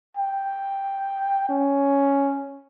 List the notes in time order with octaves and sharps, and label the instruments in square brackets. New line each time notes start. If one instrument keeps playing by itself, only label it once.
[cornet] G5
C#4